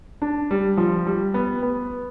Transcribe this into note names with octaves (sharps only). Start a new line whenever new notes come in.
D4
G3
F3
G3
B3
B3